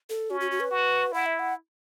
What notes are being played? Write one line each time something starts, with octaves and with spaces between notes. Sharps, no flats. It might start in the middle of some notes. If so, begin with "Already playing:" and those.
A4
C#4 F#4
F#4
F#4
B4
F#4
E4 F#5
E5
F#5